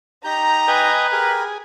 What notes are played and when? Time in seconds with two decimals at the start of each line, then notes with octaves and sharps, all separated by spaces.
0.24 D#4 G4 A#5 G6
0.68 B4 D#5 G5 G#5
1.12 G4 G#4 A#4